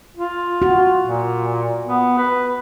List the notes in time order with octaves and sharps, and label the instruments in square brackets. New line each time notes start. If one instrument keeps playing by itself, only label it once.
[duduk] F4
[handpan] F#4
[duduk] A#2
B3
B4